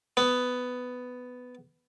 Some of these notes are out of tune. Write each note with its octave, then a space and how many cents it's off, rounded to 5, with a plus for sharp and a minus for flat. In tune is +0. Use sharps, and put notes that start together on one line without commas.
B3 +10